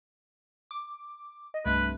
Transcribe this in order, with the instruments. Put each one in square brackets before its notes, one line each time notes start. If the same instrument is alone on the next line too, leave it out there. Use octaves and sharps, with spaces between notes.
[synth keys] D6
D#5
[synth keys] C2 G2 A3 [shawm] B4